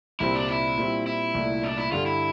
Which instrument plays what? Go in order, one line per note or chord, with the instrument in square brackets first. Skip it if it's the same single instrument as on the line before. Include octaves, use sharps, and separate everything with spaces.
[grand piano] C2 A#2 G3 C4 [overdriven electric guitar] E4
[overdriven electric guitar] D4
E4
[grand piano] A#2 G3 C4
[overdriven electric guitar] E4
[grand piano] C2 A#2 A3
[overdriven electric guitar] D4
E4
[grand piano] G2 D3 G3 [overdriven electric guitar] F4
[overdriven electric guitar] E4